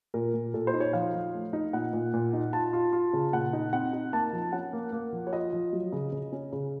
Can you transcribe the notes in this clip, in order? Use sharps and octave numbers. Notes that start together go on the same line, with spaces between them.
A#2 A#4
A#2
A#2 A4
C5
D#4
C#5
F3 F5
F3
A3
D#4
A#2 F#5
A#2
A#2
D#4
F4 A5
F4
F4
C#3
A#2 F#5
D#4
C4 F#5
D#4
A#3 A5
F3
C#4 F#5
A#3
A#3
F3
C#5
F4 D#5
F3
F#3
C#3
C#3
C#4
C#3